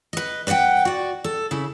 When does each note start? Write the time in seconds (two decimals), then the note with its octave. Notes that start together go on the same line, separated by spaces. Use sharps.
0.13 B4 D#5
0.47 B4 D5 D#5 F#5 G5
0.85 F#4 D5
1.24 A4
1.51 C#3 E4